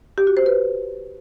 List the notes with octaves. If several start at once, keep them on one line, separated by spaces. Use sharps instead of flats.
G4
F#4
C5
B4